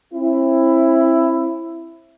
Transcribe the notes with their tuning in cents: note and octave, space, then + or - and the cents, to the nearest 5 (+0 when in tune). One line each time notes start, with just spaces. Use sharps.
C4 +35 E4 +10